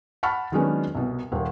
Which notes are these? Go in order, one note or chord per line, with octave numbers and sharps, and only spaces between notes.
F#5 A5 B5 C#6 F6
D#3 F#3 G#3 B3 C#4 D4
C2 B2
D#1 A#3